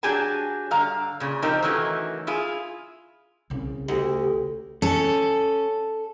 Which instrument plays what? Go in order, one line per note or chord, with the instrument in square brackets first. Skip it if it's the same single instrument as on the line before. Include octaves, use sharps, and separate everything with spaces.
[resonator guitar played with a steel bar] F#3 D4 G4 G#4 G#5 A5
G2 D3 F5 A#5
A#2 C#3
F3 C4 D#4 F4 G4 A#4
D#3 E3 F#3 A3 C#4
E4 F4 G#4
[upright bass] C2 C#3
[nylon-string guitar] D2 [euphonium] G4
[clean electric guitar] C#4 [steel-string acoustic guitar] A4